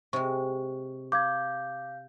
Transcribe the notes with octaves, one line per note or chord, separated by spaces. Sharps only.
C3 G#3 C#6
F5 D6 G6 G#6